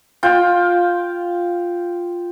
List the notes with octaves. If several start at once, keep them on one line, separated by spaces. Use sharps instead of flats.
F4 G5